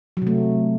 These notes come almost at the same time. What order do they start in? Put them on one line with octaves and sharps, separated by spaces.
F#3 C3 A3